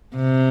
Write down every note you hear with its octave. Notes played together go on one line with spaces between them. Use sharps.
C3